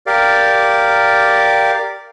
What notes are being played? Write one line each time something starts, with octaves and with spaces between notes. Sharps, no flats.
G4 A#4 D5 F5